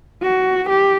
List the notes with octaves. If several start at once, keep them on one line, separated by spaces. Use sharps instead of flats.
F#4
G4